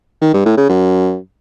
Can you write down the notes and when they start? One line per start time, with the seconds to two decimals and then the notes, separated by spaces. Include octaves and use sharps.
0.22 D#3
0.34 G2
0.45 A2
0.57 C#3
0.69 F#2